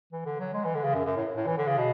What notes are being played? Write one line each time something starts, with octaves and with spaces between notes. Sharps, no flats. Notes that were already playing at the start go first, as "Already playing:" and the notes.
E3
D3
F#3
G#3
E3
D3
C#3
F#2
F#2
A2
A2
E3
D3
C#3
B2